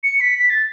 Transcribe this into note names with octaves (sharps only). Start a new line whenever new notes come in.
C#7
B6
B6
A6